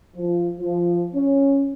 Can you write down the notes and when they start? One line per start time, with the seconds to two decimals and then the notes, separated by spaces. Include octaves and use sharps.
0.16 F3
0.59 F3
1.15 C#4